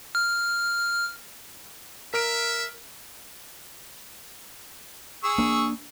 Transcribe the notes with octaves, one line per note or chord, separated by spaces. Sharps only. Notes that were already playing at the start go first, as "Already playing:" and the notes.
F6
A#4 E5 F6 D7
G#4 C#6 E6
A#3 D4